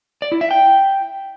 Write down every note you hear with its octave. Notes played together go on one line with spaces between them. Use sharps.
D5
E4
E5
G5